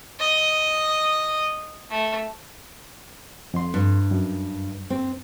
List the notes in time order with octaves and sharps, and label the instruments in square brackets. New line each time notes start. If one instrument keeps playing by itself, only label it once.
[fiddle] D#5
A3
[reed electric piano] F2 C6
[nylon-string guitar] G2
[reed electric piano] F#2
[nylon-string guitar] C4